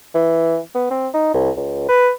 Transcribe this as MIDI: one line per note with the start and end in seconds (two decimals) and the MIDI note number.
0.14 0.59 52
0.75 0.86 59
0.90 1.08 60
1.14 1.33 63
1.34 1.50 36
1.57 1.85 37
1.89 2.11 71